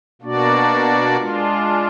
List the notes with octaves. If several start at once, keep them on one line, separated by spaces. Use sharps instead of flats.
B2 A#3 D4 F#4 D5
G#3 D4 F4